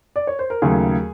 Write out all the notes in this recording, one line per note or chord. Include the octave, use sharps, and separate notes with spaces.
D5
C#5
C5
A#4
D#2 C#3 F#3 A3 G#4